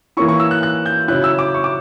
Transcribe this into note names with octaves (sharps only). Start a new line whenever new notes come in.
E3 A#3 C#4 E4 C#6
C#6
E6
F#6
F#6
G6
C#3 F#3 C#4 E4 F#6
E6
D6
C#6
D6